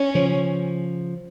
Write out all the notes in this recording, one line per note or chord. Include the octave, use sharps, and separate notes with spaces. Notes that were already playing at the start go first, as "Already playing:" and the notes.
Already playing: C#4
C#3 F3